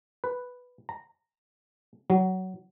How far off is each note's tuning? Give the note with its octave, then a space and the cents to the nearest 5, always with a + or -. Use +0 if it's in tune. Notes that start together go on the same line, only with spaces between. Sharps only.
B4 +0
A#5 -15
F#3 +15